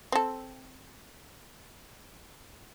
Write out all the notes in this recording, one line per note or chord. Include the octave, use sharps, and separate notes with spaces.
C4 A4